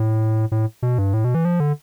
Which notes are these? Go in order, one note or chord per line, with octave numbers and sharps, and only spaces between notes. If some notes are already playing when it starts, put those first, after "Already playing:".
Already playing: A2
A2
B2
G2
A2
B2
E3
F3
D3